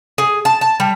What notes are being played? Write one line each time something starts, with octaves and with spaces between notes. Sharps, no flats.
G#4
A5
A5
G3